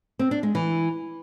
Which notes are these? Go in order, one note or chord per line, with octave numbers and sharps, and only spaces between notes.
C4
D4
G#3
E3